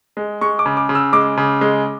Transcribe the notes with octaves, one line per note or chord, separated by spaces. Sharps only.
G#3
G#3 C#6
D6
C#3
D6
C#3
E6
G#3 D6
C#3
G#3